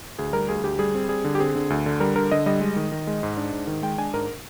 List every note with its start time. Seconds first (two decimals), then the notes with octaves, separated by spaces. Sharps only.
0.19 D2 G#4
0.33 G3 A#4
0.49 D2 G#4
0.63 D2 G4
0.79 G3 G#4
0.95 C4
1.09 G3 G#4
1.24 D3
1.35 G4
1.40 C4 G#4
1.55 D3
1.70 D2
1.86 D3
2.00 G3 A#4
2.16 D3 A#4
2.31 D3 D#5
2.46 G3 D#5
2.61 G#3
2.76 D#3
2.92 D#3
3.07 G#3
3.23 G#2
3.37 D4
3.52 G#2
3.67 D#3
3.82 G#3 G5
3.98 D4 G#5
4.14 G#2 A#4